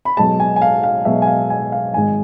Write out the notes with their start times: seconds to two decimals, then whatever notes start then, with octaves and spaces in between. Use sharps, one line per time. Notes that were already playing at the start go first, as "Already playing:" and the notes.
0.05 B5
0.17 B1 B2 G#3 A5
0.40 G#5
0.56 G#5
0.62 F5
0.83 F5
1.05 B1 B2 G#3 E5
1.22 G#5
1.27 F5
1.50 G#5
1.72 F5
1.94 G#1 G#2 G#3 G#5